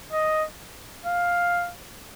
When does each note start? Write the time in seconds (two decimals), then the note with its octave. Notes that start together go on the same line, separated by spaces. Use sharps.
0.12 D#5
1.06 F5